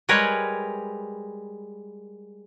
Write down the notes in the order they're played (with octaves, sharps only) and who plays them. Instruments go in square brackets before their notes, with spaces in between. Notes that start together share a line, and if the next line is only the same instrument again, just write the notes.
[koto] G3 G#3 A#4 B4 C#5